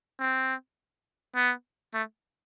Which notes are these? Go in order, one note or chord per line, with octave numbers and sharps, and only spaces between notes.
C4
B3
A3